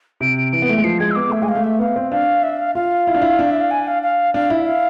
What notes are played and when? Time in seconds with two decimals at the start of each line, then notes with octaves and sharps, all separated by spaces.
0.21 C3 D7
0.37 D7
0.52 E3 D7
0.62 B3
0.69 A3
0.77 G#3
0.84 F3 C7
1.00 G#3 G#6
1.11 E6
1.15 B3 D6
1.29 A3 E5
1.42 G#3 G#5
1.48 F5
1.55 A3
1.64 E5
1.79 B3 F5
1.96 C4
2.12 D4 F5
2.43 E5
2.59 F5
2.75 F4 F5
3.07 E4
3.14 D4
3.22 E4
3.39 D4
3.51 E5
3.60 F5
3.71 G#5
3.87 F5
4.02 F5
4.34 D4 F5
4.50 E4 E5
4.66 F5